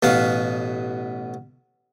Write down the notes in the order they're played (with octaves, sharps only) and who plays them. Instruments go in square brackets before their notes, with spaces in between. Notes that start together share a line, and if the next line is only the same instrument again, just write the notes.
[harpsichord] A1 B2 B3 F5